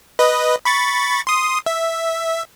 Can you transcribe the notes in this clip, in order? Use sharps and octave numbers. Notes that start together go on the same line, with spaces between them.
B4 D#5
B5 C#6 A6
C6 D#6
E5